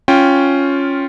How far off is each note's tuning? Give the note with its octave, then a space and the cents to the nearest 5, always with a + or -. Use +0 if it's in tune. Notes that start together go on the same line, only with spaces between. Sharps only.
C#4 +0 F4 +0 G5 +0